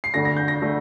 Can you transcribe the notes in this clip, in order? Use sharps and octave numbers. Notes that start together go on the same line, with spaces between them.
C7
D2 D3 A3 A#6
A#6
G6
A#6
D3 A3